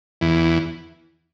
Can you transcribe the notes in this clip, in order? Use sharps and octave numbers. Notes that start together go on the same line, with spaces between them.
E2